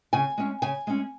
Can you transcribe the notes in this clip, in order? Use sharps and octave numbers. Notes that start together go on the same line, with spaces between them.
C#3 G#5
G#3 C#4
C#3 G#5
G#3 C#4